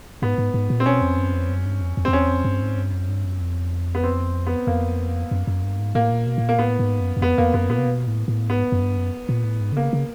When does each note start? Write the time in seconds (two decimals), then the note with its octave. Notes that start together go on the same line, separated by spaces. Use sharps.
0.22 G#2 B3
0.38 G#2
0.54 G#2
0.70 A#2
0.80 C4
0.86 B2 C#4
1.02 F2
1.18 F#2
1.33 F2
1.49 F#2
1.65 G2
1.81 F2
1.97 F2
2.05 C4
2.08 F2
2.13 E2 C#4
2.29 F2
2.45 G2
2.61 G#2
2.77 G2
2.93 F#2
3.08 G2
3.25 F#2
3.41 F2
3.95 B3
4.04 C4
4.47 B3
4.67 F2 A#3
5.31 F#2
5.47 F#2
5.63 G2
5.79 G#2
5.95 A2 A#3
6.11 A#2
6.26 B2
6.38 A2
6.43 A#2
6.49 A#3
6.58 A2 B3
6.79 G#2
7.01 F#2
7.17 F#2
7.22 F2 B3
7.38 F2 A#3
7.54 F#2 B3
7.70 A#2 B3
7.78 C3
7.86 B2
8.07 A2
8.28 A2
8.49 G#2 B3
8.72 F#2
8.81 G2
8.97 F#2
9.29 A#2
9.44 A2
9.61 G#2
9.72 D3
9.76 C#3 A#3
9.93 C#3